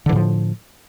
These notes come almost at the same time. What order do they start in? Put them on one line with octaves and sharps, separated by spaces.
D3 E3 A2 F3